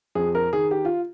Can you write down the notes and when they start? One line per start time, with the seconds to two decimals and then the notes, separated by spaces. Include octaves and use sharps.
0.15 F2 G#4
0.35 A#4
0.53 D#3 G#4
0.71 G4
0.85 F4